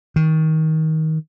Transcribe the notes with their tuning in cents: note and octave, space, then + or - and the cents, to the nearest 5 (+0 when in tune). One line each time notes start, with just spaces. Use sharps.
D#3 +20